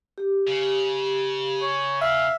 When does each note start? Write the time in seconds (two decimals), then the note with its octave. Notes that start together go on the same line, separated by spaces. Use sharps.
0.18 G4
0.47 C#3
1.62 C#5
2.02 E5 F5